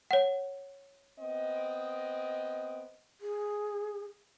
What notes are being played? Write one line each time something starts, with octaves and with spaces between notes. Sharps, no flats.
C#5 F#5
B3 C4 D#5
G#4